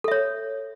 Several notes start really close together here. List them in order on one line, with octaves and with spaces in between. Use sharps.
A4 E5 C#5